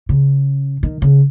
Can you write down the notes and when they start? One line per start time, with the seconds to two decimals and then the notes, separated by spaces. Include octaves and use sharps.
0.09 C#3
0.83 D#3
1.02 C#3